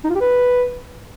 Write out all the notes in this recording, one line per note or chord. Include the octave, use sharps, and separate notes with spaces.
D#4
F4
G4
B4